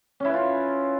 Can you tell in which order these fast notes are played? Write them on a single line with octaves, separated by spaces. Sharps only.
C#4 E4 B4 F4